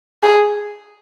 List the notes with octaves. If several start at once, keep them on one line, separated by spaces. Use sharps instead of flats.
G#4